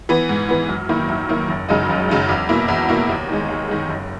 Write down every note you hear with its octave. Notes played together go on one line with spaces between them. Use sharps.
E3 B3
G#2
E3 B3
F#2
D#3 A#3 E4
F#2
D#3 A#3 E4
F#1
F#2 C#3 G#3 D#4
F#1
F#2 C#3 G#3 D#4
E2
B2 A#3 E4
E2
B2 A#3 E4
D#2
D#3 G#3
D#2
D#3 G#3
F#1